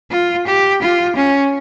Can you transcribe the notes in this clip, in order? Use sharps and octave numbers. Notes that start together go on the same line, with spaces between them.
F4
G4
F4
C#4